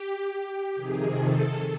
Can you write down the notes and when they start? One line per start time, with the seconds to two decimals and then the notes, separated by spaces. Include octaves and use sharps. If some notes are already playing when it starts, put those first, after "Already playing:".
Already playing: G4
0.76 F2 C3 D#3 G#4
1.15 A4